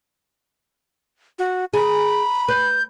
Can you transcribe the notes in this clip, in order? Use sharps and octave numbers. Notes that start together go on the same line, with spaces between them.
F#4
G#4 A#5 B5
B4 G6